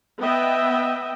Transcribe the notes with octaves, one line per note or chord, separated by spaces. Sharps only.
B3 D#5 E5 G5